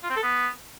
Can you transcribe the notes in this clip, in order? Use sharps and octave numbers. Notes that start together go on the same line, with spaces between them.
F4
C4
A4
B3